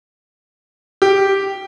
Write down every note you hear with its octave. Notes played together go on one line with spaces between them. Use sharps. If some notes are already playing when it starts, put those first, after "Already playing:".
G4